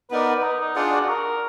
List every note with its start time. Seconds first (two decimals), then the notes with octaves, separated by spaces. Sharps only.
0.10 B3 D#4 A#4 B4 D5
0.43 D#4
0.60 D#4
0.75 D4 F4 G#4 D5 F#5
0.93 F#4
1.08 A#4